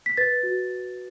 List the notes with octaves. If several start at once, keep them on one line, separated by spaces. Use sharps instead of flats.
B6
B4 A6
F#4